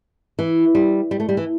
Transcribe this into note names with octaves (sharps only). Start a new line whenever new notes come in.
E3
G3
G3
A3
G3
E3